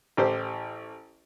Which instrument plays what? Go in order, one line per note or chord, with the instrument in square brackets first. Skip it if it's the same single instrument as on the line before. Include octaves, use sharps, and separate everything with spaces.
[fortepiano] A1 G4 C5